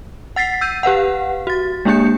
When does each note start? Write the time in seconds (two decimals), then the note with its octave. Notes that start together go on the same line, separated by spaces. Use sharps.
0.36 F#5 A6 B6 C7
0.61 E6 G6 D#7
0.83 G4 B4 F5 F#5
1.47 F#4 A6
1.85 G#3 A#3 D4 G4 G6 C#7